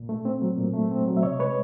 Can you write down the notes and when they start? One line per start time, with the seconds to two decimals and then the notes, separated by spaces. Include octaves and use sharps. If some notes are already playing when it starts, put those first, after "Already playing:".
Already playing: A#2
0.09 A3
0.25 C4
0.42 F#3
0.58 A#2
0.74 A3
0.91 C4
1.07 F#3
1.17 E5
1.23 C3 C#5 D#5
1.39 G#3 B4 C#5